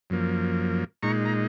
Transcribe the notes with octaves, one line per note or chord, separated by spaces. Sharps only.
F#2 F3 A#3
A#2 G#3 D#4 A#5 C#6
A#5